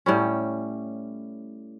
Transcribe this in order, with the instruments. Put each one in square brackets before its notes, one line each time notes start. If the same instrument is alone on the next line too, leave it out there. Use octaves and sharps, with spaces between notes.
[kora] A2 G3 C#4